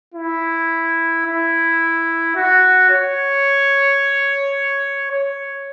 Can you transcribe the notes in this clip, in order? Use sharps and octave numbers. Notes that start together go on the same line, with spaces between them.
E4
E4
F#4
C#5
C#5